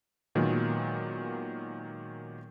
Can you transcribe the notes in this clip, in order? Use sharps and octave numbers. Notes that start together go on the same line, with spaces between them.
A#2 D#3 F#3 G#3 A#3 B3